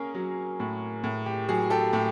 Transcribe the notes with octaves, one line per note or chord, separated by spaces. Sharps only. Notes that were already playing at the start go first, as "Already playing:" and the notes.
Already playing: A#3 C#4 G#4 A#4
F#3
A2
A2
G4
F#3 G#4
G4 A4
A2 G4